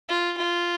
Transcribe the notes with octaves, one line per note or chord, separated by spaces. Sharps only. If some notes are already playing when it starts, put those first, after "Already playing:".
F4
F4